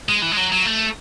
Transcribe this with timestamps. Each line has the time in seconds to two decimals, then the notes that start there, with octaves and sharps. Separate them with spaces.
0.09 G#3
0.22 E3
0.32 G#3
0.37 F#3
0.52 F#3
0.65 A3